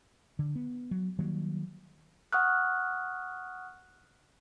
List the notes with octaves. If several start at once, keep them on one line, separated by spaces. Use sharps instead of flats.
D3
B3
F#3
D#3 F#3 G3 A#3
F#5 C#6 D#6 F6 F#6